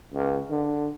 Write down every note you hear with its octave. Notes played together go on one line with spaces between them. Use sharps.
C#2
D3